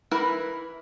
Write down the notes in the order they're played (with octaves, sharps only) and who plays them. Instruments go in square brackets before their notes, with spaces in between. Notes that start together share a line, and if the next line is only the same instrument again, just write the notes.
[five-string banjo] E3 E4 A#4 B4